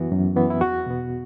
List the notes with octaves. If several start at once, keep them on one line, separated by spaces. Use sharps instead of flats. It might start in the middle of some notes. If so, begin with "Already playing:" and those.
Already playing: F#2 E3 B3 F#4
F#2
E3 B3
E4
E2 F#4
B2 B3